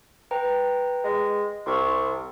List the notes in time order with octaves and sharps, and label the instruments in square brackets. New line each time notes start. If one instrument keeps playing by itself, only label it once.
[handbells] B4 G5 A#5
[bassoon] G#3
[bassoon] C2 [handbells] C6 C#6